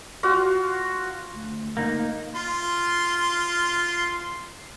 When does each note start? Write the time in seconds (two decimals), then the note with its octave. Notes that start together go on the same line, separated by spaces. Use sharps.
0.23 F4 F#4 F5
1.32 D2
1.77 A#3 D#4
2.35 F4 C6